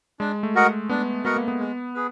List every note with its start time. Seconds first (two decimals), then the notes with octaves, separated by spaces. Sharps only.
0.20 G#3 D4
0.43 A3
0.55 F#4 A#4 D#5 F#5
0.89 B3 D4
1.25 B3 F#4 A#4 D#5 F#5
1.36 A#3
1.48 B3
1.60 G#3
1.95 G#4 B4